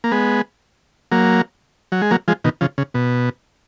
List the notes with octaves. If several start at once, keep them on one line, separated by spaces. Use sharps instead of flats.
A#3
G#3 B3
F#3 A#3
F#3
G#3
F#3 A#3
F3 G#3
B2 D#3
C#3 F3
C#3
B2